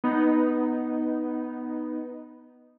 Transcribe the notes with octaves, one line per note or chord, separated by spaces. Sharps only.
B3 D#4